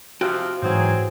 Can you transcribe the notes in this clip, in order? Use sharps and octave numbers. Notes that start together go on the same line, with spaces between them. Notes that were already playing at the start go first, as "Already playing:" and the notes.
C3 F3 F#4 G5
G#2 E3 F#3 C4 G#4 G#6